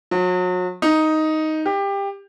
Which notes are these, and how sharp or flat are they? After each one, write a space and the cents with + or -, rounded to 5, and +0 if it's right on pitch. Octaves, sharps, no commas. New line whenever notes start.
F#3 -35
D#4 +5
G4 +20